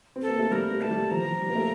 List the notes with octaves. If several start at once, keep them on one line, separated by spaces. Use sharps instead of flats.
C4
A4
A#3
A3
G3 A#4
A3
A3 A5
G3
F3 A#5
F3
G3
A#3
A3